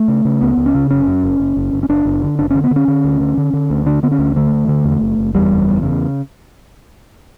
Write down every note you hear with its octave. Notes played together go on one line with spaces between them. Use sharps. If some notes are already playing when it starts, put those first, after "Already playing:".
Already playing: A3
C#3
C#3
C#2 B3
C#2
C#4
C#3
F#1 C#4
F#2
F#1
F#1
F#1
F#1
C#4
F#1 D4
F#1
D3
F#1 D4
D3 C#4
B3
D3 C#4
D3
D2
D3
D3
D3
D2
D3 D4
D3 B3
C#4
D2
D3 A3
D2
D3
E2
F#1
F#1
E2 G3
F#1
E2
C#3